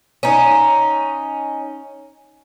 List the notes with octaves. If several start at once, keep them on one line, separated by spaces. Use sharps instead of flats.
C#4 D#4